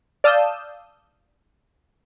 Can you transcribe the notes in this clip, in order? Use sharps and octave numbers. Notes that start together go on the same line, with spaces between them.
D5 F5 A5 D#6 E6 G6